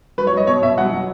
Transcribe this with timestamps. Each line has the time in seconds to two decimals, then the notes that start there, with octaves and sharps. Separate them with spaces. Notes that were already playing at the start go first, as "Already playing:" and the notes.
0.18 F#3 B4
0.27 C#5
0.33 F#3 D#5
0.47 B2 C#5
0.62 B2 E5
0.78 F#3 F#5
0.92 F#3